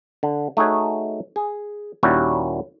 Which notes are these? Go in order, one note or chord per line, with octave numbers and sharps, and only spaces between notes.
D3
A3 D#4 F#4 G#4 C#5
G#4
D#2 A#2 G3 C#4 E4 F#4